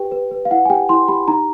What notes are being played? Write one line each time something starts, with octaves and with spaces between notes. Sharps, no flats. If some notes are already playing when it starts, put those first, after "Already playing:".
Already playing: G4 B4 G5
B4
B4
F5
E4 F#5
G#5
G4 G5
E4 C6
G4 B5
D#4 A#5